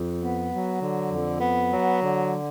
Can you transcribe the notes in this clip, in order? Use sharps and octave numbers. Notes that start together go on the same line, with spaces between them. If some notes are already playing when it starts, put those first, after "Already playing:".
Already playing: F2
B3
F#3
D3
F2
B3
F#3
D3